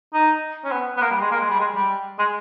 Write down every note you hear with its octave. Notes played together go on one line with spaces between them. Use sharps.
D#4
C#4
B3
B3
A#3
G3
G#3
A#3
G#3
G3
G#3
G3
G#3